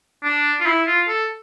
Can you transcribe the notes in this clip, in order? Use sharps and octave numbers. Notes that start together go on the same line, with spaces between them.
D4
F4
E4
F4
A4